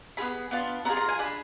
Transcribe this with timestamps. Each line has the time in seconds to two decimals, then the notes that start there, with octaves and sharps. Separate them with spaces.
0.17 B3 F4 G#4 B5
0.51 B3 D4 F4
0.85 B3 D4 F4 G#4 A#5
0.97 A#5
1.09 G#5
1.19 D4 G#4 B5